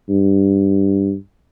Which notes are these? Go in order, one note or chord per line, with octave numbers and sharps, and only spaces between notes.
G2